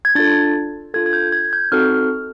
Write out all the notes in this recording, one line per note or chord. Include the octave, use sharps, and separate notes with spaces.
G#6
D4 F4 A4 A6
D4 F4 A4 G#6
G#6
G6
G#6
G6
C4 D#4 F#4 A4 F6